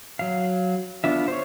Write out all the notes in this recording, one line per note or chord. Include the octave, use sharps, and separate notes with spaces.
F#3 F5
B3 D4 F4 E5
C5 C#5